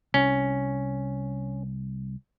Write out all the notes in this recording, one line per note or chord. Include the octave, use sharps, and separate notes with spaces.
C2 C#4